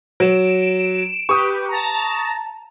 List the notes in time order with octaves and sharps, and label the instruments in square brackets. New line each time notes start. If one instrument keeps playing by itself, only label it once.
[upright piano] F#3 [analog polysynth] D7 E7
[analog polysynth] G4 B4 [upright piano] C#6 D#6
[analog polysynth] A5 A#5